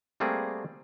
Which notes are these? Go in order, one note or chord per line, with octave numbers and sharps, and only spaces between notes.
G3 A3 A#3 C4 G#4